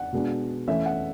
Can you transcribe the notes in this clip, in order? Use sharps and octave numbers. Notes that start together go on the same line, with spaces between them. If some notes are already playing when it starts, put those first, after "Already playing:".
Already playing: F#5
B2 G#3 B3 D4
E3 A3 C#4 E5
F#5